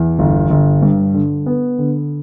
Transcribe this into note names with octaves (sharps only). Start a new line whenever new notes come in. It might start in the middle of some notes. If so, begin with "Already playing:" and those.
Already playing: E2
G1
G1
G2
D3
B3
D3